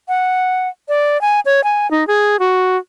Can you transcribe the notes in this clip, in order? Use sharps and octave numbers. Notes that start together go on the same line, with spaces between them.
F#5
D5
G#5
C#5
G#5
D#4
G#4
F#4